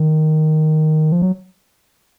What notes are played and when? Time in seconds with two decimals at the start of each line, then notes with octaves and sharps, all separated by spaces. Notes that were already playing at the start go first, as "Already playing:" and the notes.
Already playing: D#3
1.12 F3
1.22 F#3